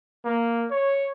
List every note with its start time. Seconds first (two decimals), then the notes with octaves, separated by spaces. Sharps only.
0.25 A#3
0.70 C#5